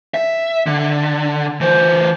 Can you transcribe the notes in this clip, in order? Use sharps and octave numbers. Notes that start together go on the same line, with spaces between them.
E5
D3
E3 C5